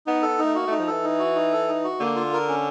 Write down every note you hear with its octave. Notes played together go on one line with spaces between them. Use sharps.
B3 D#4
A4
D#4
A3
A#3 F#4
A3 D#4
F3
E3 A4
D#4
F#4
D#4
A4
D#4
F#4
D3 A#3
F4
A#4
C#4